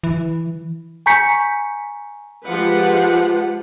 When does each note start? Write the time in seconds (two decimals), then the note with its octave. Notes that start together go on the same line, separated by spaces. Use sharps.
0.04 E3
1.06 G#5 A#5 C#6 G6 B6 C#7
2.46 F3 G#3 F4 G4 B4 F#5